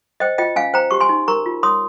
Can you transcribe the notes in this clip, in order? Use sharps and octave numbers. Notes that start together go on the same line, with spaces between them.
C5 D#5 G5
F4 D#5 G5
C#4 F5 G#5
C5 G5 A#5
G4 C#6
G#5 C6
D#4
A#4 A#5 C#6
F4
C#5 C6 D#6